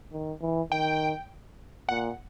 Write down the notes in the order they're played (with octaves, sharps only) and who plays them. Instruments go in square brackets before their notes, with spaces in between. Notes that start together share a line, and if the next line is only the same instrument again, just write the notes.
[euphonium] D#3
E3
[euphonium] D#3 [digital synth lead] G5
[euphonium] A#2 [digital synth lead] F#5